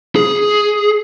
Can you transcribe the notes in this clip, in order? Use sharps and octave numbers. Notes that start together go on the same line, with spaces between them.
G#4